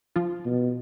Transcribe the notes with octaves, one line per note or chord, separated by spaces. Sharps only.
F3 F4
B2